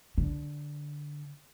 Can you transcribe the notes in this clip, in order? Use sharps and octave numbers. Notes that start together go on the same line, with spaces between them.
D3